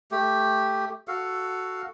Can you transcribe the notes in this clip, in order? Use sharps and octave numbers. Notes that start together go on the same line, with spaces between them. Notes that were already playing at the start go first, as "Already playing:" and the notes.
A3 G4
F#4 A4 F5